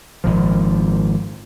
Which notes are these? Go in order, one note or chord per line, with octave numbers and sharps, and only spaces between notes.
G#1 A#2 F3